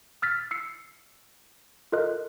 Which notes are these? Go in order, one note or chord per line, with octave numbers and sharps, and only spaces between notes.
E6 F6 A6 B6
E6 C7 C#7
F4 A4 A#4 D#5 F#6